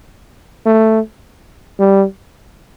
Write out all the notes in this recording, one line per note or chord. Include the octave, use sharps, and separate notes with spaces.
A3
G3